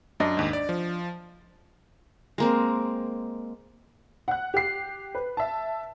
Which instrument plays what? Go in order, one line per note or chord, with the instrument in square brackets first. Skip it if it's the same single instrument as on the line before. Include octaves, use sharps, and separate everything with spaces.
[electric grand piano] F#2 [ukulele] D4 D#5
[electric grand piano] D#2 G#2
D5
F3
[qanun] G#3 A#3 C4
[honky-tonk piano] F#5 F#6
G4 C7
B4
E5 A5